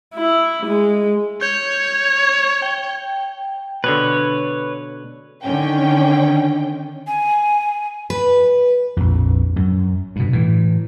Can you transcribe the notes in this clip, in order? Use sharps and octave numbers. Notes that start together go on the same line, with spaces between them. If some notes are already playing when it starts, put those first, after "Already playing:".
E4
G#3
C#5 G6
C#6
G5
B2 D3 B4 C#5
D3 D#3 C#4 G5
G#5
B4
A#1 F2
F#2
G2 B2
A2 E3